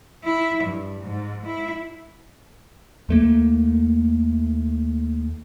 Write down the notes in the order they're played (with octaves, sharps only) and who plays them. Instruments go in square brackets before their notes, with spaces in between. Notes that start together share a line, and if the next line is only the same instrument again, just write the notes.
[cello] E4
G2
G#2
E4
[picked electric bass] D#2 A3 A#3